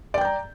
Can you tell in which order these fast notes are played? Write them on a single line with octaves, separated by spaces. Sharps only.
D5 G5 G6 A#5